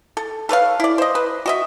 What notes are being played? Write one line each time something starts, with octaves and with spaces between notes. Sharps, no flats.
A4
A4 B4 C#5 F5
E4 D5
C5 D#5
B4
F#4 D#5 E5